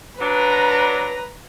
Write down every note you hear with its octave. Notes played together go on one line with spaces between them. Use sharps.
F#3 D4 B4 A#5